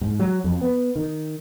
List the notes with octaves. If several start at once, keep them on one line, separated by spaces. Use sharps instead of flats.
G#2
F#3
F2
B3
D#3